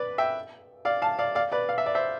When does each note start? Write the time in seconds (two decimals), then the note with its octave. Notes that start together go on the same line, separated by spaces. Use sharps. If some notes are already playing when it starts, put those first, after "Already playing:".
Already playing: B4 D5
0.18 E5 G5
0.85 D5 F5
1.02 F5 A5
1.19 D5 F5
1.35 D5 F5
1.52 B4 D5
1.69 F5
1.78 E5
1.86 D5
1.95 C5 E5